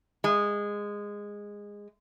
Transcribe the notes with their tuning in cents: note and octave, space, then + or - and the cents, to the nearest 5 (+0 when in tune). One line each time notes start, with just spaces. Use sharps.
G#3 -15